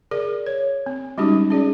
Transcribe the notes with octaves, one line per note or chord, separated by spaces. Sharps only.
G#4 A#4 D5
C#5
C4
G3 G#3 C#4 D#4 F#4 G4
C#4 G#4 D5